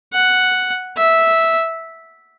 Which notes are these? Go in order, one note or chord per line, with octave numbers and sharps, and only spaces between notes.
F#5
E5